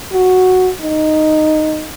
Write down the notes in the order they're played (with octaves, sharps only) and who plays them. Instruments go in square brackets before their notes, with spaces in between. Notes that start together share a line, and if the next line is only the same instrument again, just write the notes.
[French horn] F#4
D#4